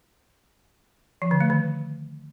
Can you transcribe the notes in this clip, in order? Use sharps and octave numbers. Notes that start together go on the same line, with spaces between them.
F3
D3
A3
D#3